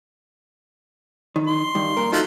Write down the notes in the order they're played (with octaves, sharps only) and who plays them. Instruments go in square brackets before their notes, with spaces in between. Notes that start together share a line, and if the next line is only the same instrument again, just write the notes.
[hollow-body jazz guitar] D#3
[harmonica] C6
[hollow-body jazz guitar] G2 D#3
A#2 A#4
[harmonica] F3 F#3 A3 [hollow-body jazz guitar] D#4